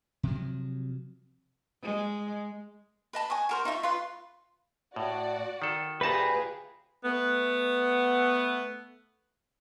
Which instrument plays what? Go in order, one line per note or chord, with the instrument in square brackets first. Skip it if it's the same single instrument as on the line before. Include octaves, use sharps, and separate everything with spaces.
[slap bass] C3 F3 F#3
[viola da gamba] G#3
[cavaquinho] B4 D#5 A5 B5
G#5 C#6 D#6
F#4 A#4 C5
D#4 F4 E5 C#6
F4 B4 C6
[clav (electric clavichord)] A2 [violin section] F#4 D5 F#5
[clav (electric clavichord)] D#3 A4
[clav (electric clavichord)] D2 D#4 A5 [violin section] F4 G4 G#4 [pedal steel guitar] B4 A#5
[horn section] A3 B3